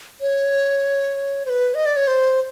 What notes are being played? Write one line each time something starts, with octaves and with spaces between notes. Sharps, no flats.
C#5
C5
B4
D#5
D5
C#5
C5